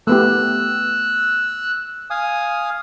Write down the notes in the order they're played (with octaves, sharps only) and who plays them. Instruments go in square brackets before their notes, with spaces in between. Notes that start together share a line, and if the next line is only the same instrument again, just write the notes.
[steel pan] A3 B3 G4 [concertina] E6 F#6
[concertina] F5 G#5 D#6